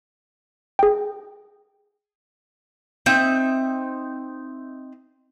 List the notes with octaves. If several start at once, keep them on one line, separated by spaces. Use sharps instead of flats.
G#4 G5
C4 D#4 E5